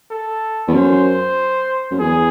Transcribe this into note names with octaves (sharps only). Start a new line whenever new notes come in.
A4
E2
F#2 C5
F#2
E2 G#4